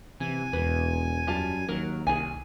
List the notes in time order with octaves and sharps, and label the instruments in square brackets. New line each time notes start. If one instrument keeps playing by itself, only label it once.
[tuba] C3 [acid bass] E3 [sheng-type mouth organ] G#5
[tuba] E1 [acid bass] E2 [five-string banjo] B4
[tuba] F#2 [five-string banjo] G3 F4 A5
[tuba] D#2 [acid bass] F#3 [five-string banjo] A#4
[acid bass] C2 [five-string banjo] G#4 G#5